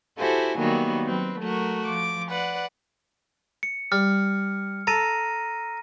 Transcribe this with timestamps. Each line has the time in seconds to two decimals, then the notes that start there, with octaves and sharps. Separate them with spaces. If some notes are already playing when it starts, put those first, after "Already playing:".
0.18 E4 F#4 G4 A4 C5 G#5
0.59 D#3 F#3 G3 A#3 B3
1.05 F#3 C4 B4
1.39 F#3 A3 F#4 A#4
1.86 F3 D6
2.29 B4 D5 F#5
3.63 C#7
3.92 G3 F6
4.87 A4 A#5 A#6 D#7